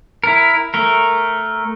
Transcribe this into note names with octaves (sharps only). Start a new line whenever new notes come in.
E4 A#4
A3 A#4